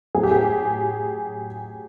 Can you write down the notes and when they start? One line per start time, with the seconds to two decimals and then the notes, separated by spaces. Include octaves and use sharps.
0.15 A2 F#3 G#4
0.23 G4
0.31 G#4